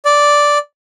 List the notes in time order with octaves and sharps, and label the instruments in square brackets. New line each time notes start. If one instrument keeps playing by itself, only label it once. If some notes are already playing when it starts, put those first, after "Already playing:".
[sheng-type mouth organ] D5